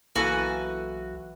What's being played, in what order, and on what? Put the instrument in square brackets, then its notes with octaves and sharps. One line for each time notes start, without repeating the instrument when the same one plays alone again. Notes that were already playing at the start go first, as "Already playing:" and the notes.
[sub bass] B1 [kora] E3 B4 [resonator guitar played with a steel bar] A#3 A4 G#5 [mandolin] F#4